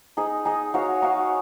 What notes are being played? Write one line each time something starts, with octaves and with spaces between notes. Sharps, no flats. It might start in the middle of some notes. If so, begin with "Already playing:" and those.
D#4 G#4 D#5
D#4 G#4 D#5
D#4 F#4 C#5 F5
D#4 F#4 C#5 F5